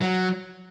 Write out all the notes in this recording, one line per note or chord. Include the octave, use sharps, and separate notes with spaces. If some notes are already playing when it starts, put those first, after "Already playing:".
F#3